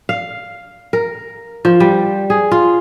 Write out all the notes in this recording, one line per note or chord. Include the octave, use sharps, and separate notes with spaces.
F5
A#4
F3
G3
G#4
F4